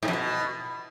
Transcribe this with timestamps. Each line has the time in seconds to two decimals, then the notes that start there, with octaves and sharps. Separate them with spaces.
0.03 G#2
0.08 F2
0.13 B2